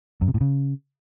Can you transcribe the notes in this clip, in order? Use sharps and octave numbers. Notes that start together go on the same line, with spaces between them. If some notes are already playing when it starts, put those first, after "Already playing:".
F#2
C3
A2
C#3